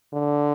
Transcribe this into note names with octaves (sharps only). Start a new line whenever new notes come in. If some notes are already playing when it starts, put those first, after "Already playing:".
D3